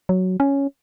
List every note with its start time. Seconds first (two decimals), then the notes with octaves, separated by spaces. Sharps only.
0.09 F#3
0.40 C#4